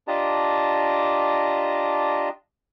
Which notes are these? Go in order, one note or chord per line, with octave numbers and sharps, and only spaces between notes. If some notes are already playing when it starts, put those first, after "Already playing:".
D4 F4 G4 D#5 A5 A#5